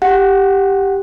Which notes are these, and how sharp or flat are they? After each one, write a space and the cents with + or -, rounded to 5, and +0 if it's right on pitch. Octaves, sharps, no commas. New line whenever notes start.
G4 +0 F#5 +0